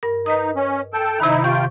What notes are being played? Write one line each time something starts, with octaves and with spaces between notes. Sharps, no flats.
G2 A#4
D#4 B4 D#5 D#6
C#4
A4 G5 E6
C3 D#3 D#4 E4
C3 F4 G5 C#6 G6